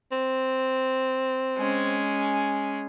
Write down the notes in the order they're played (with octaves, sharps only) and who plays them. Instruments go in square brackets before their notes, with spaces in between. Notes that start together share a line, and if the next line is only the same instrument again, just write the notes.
[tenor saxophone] C4
[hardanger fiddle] G#3 C#4